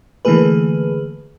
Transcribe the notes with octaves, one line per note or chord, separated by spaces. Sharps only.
D3 E3 A3 A#3 G#4 B4